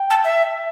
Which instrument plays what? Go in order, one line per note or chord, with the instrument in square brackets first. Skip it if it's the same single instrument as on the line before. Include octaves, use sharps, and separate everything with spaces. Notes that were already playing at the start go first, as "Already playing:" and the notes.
Already playing: [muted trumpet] G5
[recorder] A5
E5